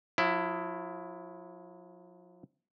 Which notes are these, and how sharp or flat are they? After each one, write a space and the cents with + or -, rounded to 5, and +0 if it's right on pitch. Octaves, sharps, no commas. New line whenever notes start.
F3 +45 E4 +10